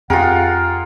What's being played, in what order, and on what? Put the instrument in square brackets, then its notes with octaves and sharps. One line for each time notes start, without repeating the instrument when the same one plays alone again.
[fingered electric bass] F2 C4 [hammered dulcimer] F4 A#4 [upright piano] G4 G#4 [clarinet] F#5